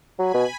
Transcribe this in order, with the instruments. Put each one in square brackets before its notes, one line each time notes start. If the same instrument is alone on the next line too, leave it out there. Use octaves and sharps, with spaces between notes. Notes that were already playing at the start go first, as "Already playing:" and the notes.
[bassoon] F#3 [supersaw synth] G#5 B5
[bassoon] B2